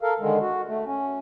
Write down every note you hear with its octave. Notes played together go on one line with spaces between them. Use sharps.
A4 A#4 F5
D3 D#3 G#3
F#4
A3
C#4